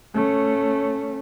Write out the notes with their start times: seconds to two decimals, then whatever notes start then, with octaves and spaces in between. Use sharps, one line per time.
0.14 A3 C#4